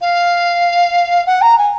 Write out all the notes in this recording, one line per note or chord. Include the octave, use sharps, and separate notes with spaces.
F5
F#5
A#5
G#5